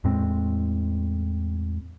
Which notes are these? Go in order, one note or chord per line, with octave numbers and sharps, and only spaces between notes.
E2 A2 G#3 C4